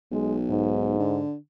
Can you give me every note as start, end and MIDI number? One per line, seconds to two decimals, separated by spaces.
0.12 0.95 35
0.12 0.36 56
0.50 1.22 44
1.00 1.35 50